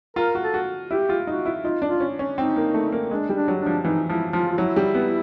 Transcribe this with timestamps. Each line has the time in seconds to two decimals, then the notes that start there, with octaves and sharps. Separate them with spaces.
0.16 F4 A#4
0.35 F#4
0.41 A4
0.54 F#4
0.91 E4 G4
1.09 F4
1.27 D#4 F#4
1.46 E4
1.64 D#4 F4
1.82 D4
1.88 F4
2.00 C#4
2.19 C#4
2.38 C4 D#4
2.56 A#3
2.74 A3
2.92 A#3
3.11 G#3 D4
3.29 G3
3.35 D4
3.48 F#3
3.61 D4
3.66 F3
3.85 E3 D#4
4.09 F3 E4
4.33 F3 F4
4.52 F4
4.58 F#3 E4
4.76 G3
4.95 B3